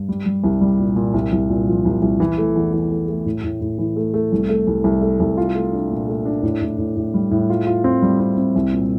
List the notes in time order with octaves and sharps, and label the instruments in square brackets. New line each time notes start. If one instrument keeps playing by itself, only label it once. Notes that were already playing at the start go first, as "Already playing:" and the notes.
Already playing: [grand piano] G2
G3
G3
C2
G3
A#2
A#2
C2
C2
A#2
F3
C2
C2
E3
A3
E2
E3
A3
A3
A2
A2
A2
E3
A3
A3
C2
A3
C2
C2
A3
C2
F4
A3
D4
A#2
A3
D4
A2
A2
A2
A2
G3
A2
F4
F4
C4
G3
C4
C4
C2
A#2